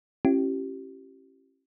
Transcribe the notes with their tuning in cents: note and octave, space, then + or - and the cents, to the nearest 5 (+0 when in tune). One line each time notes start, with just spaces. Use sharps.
C#4 -35 E4 +25 G4 -30